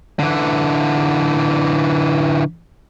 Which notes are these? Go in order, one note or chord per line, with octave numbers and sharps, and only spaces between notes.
D3 E3